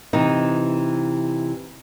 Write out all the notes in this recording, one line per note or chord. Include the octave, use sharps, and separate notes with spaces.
C3 E3 D#4